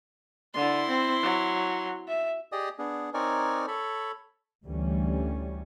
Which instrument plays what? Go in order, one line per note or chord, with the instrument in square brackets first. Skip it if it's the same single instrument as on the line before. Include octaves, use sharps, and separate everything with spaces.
[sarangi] D3 [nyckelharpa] E4 C6
[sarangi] C4
F#3
E5
[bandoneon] G4 G#4 D5 D#5 D#6
B3 D4 G#4
C4 D#4 A#4 C#5 D5 G#5
A4 C#5 B5
[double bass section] D2 E3 G3 C#4